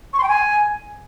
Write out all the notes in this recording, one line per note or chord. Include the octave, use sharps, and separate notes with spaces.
C#6
C6
G5
G#5